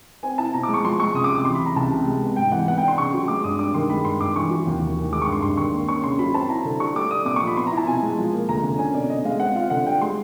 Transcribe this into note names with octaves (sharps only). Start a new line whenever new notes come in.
C4 G#5
E4 A5
B2 A#5
D6
G#3
C#6
F3 C6
G#3 C#6
C#2 D#6
D6
C3
D6
E3 C6
B5
C#2
A#5
C#2 A5
C3
G#3
B3
G#2 G5
E3 F#5
B3 F#5
G5
D4 C6
C#3 C#6
F#3
G#3 D6
G2 D#6
G2 D6
D#3 C6
G#3 B5
G2 C6
G2 D6
E3 C#6
F#3
D#2
D#2
D#3
G#3 D6
C#6
G2
C6
G2 C6
D#3 C#6
A#3
C#4 C#6
C#3 C6
F#3 B5
C4 A5
E4 A#5
D3
G3 C#6
A3 D6
D4 D#6
A#2 D6
C#6
F3
B5
B3 C6
A#5
E4
A5
B2 G#5
G#3
F3
A#3
D2 A#5
D3
C#4 G#5
B2 D5
B2 D#5
G#3 F5
C4 F#5
F4 F5
D3 F#5
G3 G5
G#3 C6